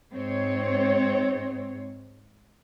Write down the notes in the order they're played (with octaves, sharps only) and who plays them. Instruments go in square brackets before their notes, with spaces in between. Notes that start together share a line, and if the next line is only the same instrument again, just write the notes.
[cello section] G#2 C4 C#5